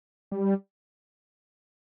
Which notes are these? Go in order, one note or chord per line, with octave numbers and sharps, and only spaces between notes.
G3